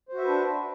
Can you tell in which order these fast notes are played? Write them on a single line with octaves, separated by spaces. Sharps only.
C5 F#4 E5 B4 D4